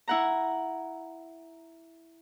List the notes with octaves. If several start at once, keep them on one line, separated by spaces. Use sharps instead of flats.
E4 F#5 A#5